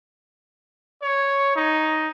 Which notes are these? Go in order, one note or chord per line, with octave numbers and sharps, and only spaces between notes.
C#5
D#4